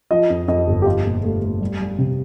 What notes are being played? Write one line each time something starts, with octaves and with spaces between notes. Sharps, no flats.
F3 D#5
F2
F2 D#5
G1
G4
F3 F4
A#2
A3
A3
G3
G3
C3